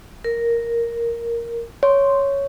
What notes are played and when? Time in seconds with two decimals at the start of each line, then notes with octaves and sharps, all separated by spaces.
0.24 A#4
1.83 C#5 C6